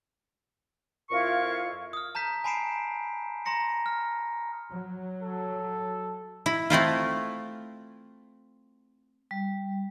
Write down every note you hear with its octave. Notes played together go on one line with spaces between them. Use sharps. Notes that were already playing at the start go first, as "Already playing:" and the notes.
F2 E4 F4 A#4 F5 C#6
D#6 F6
A5 A#5 G6 B6
G#5 A5 B5 C7 D7 E7
A#5 C6 A#6 C#7
F6
F#3
A4
E4
A3 C4 E4 F4
G3